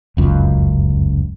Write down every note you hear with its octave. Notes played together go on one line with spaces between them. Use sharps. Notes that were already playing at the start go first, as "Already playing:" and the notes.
F1 C#2 F#2